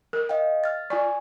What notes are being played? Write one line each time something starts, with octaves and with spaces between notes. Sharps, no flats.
A#4
D#5 F5 G5
F6 A6
F4 D5 G#5 C#6